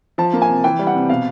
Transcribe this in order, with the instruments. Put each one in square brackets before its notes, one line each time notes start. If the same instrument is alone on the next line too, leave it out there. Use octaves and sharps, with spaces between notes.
[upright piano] F3 A5
A#3
G#5
C3
E3 G5
G3
F#5
C3
B2 F5